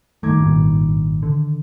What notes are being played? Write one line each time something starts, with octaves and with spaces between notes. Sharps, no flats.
G2 D#3 A3 D6 G#6
G#1 G2 A#2
D3